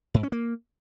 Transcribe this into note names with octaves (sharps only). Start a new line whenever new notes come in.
G#2
C#4
A#3